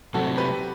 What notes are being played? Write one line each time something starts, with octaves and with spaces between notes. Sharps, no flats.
C3 F#3 A3 C4 F#4 A4
G4 B4